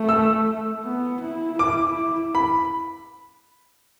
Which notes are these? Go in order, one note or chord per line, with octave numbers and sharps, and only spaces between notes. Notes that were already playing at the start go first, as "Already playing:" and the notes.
Already playing: A3
E6
B3
E4
E4 D6
B5